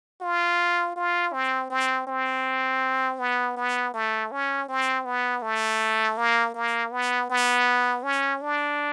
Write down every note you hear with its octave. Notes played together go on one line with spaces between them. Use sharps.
F4
F4
C4
C4
C4
B3
B3
A3
C#4
C4
B3
A3
A#3
A#3
B3
B3
C#4
D4